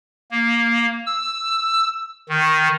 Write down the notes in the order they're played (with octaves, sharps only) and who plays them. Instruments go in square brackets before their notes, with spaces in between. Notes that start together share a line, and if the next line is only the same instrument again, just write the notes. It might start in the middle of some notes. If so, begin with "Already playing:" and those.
[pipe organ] A#3
E6
D#3